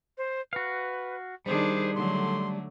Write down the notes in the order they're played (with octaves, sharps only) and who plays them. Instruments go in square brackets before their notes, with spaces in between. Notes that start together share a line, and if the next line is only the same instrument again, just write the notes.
[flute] C5
[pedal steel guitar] F#4 F5 [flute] B4
[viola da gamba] D#3 D4 G#4 [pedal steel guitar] G3 [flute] C5
[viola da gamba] D3 F#3 A3 [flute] C6